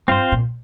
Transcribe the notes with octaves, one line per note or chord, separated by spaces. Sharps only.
G2 C4 F4 C5
A#2